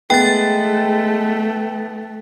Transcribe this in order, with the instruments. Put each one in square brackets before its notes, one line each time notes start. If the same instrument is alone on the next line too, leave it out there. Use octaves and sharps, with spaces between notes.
[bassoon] G#3 [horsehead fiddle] A3 [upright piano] B3 [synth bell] G5 A6